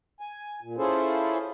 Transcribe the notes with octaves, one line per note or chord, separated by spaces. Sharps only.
G#5
A#2
C#4 E4 F4 G#4 A4 C5